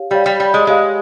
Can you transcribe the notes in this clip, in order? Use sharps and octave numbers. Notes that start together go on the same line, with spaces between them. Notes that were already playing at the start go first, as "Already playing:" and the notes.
Already playing: G4 C#5 F5
G3 G4 C#5 F5
G3
G3
G#3
G#3 G4 C#5 F5